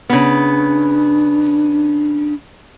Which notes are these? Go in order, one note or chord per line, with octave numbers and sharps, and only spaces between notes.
C#3 B3 D4